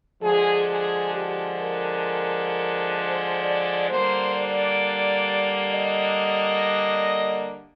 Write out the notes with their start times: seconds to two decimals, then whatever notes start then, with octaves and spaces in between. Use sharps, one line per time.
0.23 D3 F3 G#3 G#4
0.69 G#4
1.14 G4
1.60 A#4
2.98 C5
3.44 D5
3.89 D3 G3 A#3 C5
4.35 D5
5.73 D#5